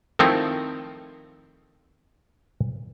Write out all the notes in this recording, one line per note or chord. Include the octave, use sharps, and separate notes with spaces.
D#3 F3 A3 C4 D#4 E4